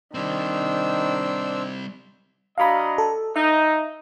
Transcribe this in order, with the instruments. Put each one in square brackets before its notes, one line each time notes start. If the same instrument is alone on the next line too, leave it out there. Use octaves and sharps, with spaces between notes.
[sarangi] D#3 [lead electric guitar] G3 C4 [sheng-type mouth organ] D4 C5 E6
[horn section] F#3 D4 D#5 [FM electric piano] F5 B5
[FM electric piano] A4
[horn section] D#4 [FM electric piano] E5